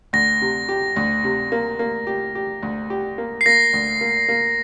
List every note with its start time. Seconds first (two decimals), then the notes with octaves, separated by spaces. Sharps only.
0.13 D2 A#6
0.41 C3
0.69 G4
0.96 D2
1.24 C3
1.52 A#3
1.79 A#3
2.07 G4
2.35 G4
2.62 D2
2.90 G4
3.18 A#3
3.41 C7
3.46 A#3 A#6
3.73 D2
4.01 A#3
4.28 A#3